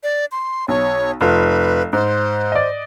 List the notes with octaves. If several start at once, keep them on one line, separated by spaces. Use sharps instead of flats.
D5
C6
B1 C#5
F1 F4 B4 F5
G#2 C5
D5 D#5